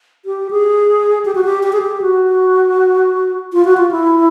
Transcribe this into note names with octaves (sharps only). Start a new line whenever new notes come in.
G4
G#4
G4
F#4
G4
G4
G#4
G4
F#4
F4
F#4
F4
E4